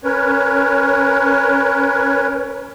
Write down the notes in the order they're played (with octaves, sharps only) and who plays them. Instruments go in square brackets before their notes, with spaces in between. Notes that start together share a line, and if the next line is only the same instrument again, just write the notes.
[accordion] C#4 A#4 B4 C#5